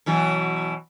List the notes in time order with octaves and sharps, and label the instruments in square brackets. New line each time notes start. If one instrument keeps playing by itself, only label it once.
[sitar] B2 E3 F#3